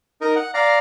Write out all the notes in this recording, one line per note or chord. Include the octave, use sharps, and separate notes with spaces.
D#4 A#4
F#5
D5 F5 A#5